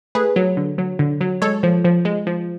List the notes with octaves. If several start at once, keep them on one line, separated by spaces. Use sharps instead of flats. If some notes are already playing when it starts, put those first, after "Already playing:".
A3 G#4 B4
F#3
D3
F#3
D3
F#3
G#3 A4 C#5
F3
F3
G#3
F3